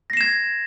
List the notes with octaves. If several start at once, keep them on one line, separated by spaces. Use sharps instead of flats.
G#6 A#6 C7 E7